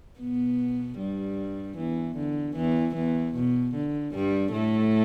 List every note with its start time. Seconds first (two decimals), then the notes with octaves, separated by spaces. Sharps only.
0.20 B2 B3
0.99 G2 G3
1.77 E2 E3
2.16 D3
2.56 E2 E3
2.95 E2 E3
3.34 B2
3.75 D3
4.14 G2 G3
4.52 A2 A3